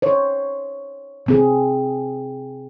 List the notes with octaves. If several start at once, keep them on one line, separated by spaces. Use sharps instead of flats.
C5 C#5
C3 C4 G#4